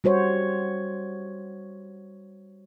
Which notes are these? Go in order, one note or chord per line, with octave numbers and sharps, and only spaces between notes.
G3 F#4 C5 C#5